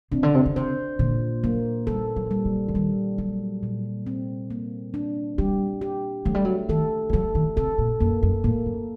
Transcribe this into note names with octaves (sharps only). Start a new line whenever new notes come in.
C3 D4
D3
C3
D3
C3 C5
A#2 D3
F#3 A#3
G3 A4
F#3
G3
F#3
D3
D#3 G3
F#3 G3
A#2
C4
A#3
D4
G3 G4
G4
F#3 A3
G3
F#3
D#3 A4
G3
F#3 A4
D#3
C3 A4
A#2
F#2 A#3
F#2
A2 A#3
F#2